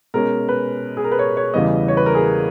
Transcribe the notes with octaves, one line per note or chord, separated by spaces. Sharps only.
B2 G#3 C#4 A#4
B4
G#4
A#4
B4
C#5
C#5
E2 C#3 E3 G3 B3 D#5
C#5
B4
A#4
G#4